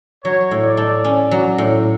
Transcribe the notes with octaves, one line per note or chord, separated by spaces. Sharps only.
F#3 C#5
A2
D5
A3
C#4
F#3
A2